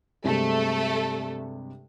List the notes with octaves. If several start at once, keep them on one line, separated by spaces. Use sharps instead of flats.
G2 C3 G#3 A3 A4